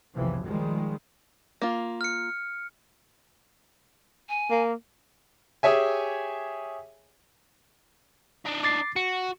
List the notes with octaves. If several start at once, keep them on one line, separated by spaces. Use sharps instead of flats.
F#1 B1 F2 C3 E3 F3
D#3 F3 G3 G#3
A#3 F4
F6 C#7
G#5
A#3
G4 G#4 C#5 E5 G#5
D4 D#4
D6 A6 C7
F#4 C#7